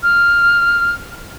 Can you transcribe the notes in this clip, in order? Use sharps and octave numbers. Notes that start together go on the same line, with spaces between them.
F6